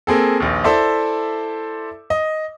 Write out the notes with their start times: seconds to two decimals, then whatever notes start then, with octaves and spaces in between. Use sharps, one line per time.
0.07 A#3 C4 G#4 A4
0.40 A#1 D#2
0.64 E4 A4 C5 D5 E5
2.10 D#5